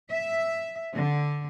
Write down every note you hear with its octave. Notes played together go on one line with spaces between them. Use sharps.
E5
D3